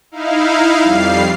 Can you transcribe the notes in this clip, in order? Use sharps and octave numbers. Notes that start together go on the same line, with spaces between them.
D#4 E4 F5
F2 G3 F5 C7